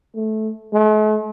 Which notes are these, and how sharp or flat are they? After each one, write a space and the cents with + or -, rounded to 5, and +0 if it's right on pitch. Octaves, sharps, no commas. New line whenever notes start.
A3 -15
A3 -45